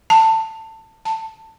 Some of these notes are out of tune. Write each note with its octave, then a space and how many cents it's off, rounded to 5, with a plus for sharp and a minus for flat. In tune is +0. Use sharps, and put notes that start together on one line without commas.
A5 +20
A5 +15